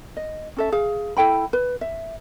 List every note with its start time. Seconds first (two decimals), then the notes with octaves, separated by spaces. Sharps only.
0.17 D#5
0.57 C#4 A4 E5
0.72 G#4 F5
1.17 E4 A4 G5 B5
1.53 B4
1.81 E5